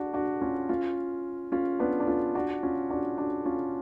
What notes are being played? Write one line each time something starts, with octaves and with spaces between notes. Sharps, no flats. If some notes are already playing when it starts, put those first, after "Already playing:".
Already playing: D4 F#4
D4 F#4
C#4 F4
C#4 F4
C#4 F4
B3 D4
D4
C#4 F4
D4 F#4
C#4 F4
D4 F#4
D4 F#4
C#4 F4